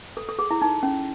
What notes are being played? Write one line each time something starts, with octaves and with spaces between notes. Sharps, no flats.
A4
A4
G#4
E4
D#4
C#4